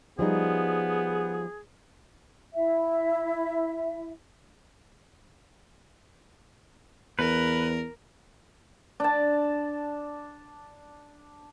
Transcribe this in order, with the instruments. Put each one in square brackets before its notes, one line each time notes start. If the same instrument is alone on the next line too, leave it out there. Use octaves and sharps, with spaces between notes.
[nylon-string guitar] F3 G3 D#4 [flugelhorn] B3 [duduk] G#4
[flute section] E4 E5
[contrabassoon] E2 [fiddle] A#4 [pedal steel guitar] B4
[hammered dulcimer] D4 A5